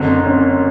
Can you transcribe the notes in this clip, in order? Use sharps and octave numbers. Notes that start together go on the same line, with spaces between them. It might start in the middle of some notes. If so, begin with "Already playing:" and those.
Already playing: F#1 F#2 D3 C4
C4
C#4